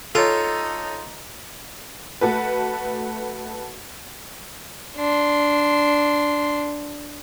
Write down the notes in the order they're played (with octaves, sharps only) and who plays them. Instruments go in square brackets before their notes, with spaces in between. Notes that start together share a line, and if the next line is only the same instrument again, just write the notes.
[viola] D#4 [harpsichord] F4 [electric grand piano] A4 C#5
[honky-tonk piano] A3 F#4 A4 B4
[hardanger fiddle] D4 C6